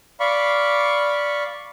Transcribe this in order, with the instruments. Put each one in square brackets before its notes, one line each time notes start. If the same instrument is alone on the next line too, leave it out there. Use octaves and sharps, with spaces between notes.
[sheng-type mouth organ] D5 F5 B5 C#6